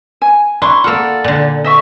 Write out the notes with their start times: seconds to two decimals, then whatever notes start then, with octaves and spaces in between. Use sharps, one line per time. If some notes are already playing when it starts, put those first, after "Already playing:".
0.22 G#5
0.62 D4 E4 C6 C#6
0.84 A#3 F4 A4 D5 F#5
1.24 A#2 D3
1.64 D#5 E5 C#6